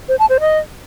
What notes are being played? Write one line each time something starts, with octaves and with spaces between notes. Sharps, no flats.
C5
A5
C5
D#5